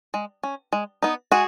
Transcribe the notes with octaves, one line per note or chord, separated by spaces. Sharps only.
G#3
C#4
G#3
B3 D#4
G#3 F#4 G#4